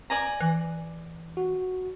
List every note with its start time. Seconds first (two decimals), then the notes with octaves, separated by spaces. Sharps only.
0.10 D5 G#5 A#5
0.41 E3
1.37 F#4